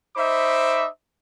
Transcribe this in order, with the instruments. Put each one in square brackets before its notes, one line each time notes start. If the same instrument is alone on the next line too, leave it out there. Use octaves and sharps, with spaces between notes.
[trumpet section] D#4 C5 E5 B5 D6